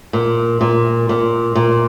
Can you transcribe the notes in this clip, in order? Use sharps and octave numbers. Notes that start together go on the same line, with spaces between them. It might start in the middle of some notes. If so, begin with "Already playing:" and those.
A#2
A#2
A#2
A#2